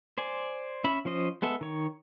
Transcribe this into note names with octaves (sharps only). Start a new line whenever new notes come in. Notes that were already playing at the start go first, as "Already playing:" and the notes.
C5 D5 G#5
C#4 E5 B5
F3 C#4 C5 D#5
G#3 B3 A4 E5
D#3 C#5